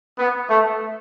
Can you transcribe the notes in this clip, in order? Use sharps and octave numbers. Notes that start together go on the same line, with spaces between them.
B3
A3